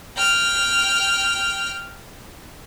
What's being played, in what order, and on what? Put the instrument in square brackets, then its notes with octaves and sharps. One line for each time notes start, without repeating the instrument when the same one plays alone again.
[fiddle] G5 F6